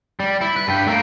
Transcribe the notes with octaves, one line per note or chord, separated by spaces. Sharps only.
G3
E4
B4
G2 G5
A3 A#3